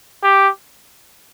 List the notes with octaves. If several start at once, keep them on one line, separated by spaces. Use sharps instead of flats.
G4